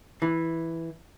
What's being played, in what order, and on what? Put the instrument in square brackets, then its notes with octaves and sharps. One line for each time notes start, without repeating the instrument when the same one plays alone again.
[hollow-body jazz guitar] E3